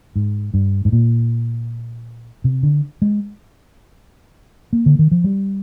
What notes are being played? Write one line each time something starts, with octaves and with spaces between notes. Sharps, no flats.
G#2
G2
G#2
A#2
C3
D3
G#3
A#3
D3
D#3
F3
G3